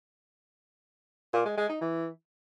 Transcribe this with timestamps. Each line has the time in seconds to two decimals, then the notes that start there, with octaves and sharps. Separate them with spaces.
1.33 A#2
1.45 G#3
1.57 G#3
1.69 D#4
1.81 E3